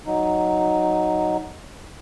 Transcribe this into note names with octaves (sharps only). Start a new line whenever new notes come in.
F#3 D#4